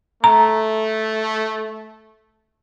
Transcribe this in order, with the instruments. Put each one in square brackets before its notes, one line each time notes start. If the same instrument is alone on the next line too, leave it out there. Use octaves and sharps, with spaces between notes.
[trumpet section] A3 [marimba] A#5